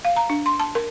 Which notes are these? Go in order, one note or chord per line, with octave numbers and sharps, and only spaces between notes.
F5
A#5
D4
C6
A5
A#4